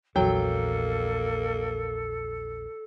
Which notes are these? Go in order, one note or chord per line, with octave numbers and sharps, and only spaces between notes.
A#1 E2 F#3 A#3 A4 G5